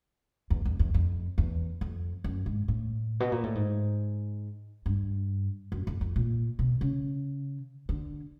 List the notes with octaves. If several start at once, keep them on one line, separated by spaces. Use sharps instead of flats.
E2
F2
E2
F2
E2
F2
F#2
G#2
A2
B2
A#2
A2
G#2
G2
F#2
F2
F2
A#2
B2
C#3
D3